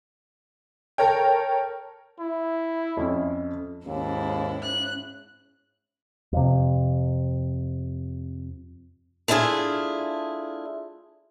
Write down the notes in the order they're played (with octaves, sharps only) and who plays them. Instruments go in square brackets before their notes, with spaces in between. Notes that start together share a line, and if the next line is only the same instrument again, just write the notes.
[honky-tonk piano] A4 A#4 C#5 G5
[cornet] E4
[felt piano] F2 C#4
[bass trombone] D#2 [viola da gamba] G#2 E4 [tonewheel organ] C#4
[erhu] F#6
[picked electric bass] F2 C3
[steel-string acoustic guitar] A3 D4 E4 F4 G#4